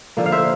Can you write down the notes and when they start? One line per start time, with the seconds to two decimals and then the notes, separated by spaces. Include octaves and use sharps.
0.17 D3 F3 A#3
0.26 F5
0.32 C5 E5